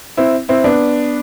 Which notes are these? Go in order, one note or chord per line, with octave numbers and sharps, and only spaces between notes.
C4 E4
C4 E4
B3 D4